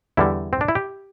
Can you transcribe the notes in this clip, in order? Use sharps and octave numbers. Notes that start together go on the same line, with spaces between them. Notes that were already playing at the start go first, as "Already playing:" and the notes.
E2 D3 G3 E4
C4
D4
E4
G4